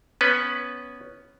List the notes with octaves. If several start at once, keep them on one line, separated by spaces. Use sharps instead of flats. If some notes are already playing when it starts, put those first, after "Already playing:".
B3 C#4 B4